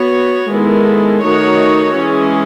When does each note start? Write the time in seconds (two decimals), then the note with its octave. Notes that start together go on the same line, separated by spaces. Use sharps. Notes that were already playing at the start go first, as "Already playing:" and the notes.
Already playing: B3 F#4 C#5
0.50 D#3 G#3 B3 E4 A4
1.23 D#3 A3 D#4 F#4 C#5
1.96 E3 G#3 C#4 G#4